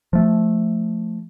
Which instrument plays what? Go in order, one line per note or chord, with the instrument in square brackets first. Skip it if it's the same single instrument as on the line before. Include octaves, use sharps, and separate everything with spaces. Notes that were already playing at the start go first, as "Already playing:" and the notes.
[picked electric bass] F3 A3